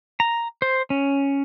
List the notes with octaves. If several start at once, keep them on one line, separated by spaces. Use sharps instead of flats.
A#5
C5
C#4